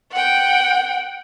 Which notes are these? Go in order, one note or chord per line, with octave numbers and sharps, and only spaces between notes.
F#5 G5